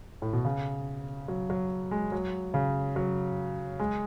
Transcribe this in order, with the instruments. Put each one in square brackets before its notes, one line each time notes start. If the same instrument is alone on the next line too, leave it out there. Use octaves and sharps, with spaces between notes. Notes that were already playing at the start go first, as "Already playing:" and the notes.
[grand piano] A2
B2
C#3
F#3
F#3
G#3
F#3
C#3
F#3
G#3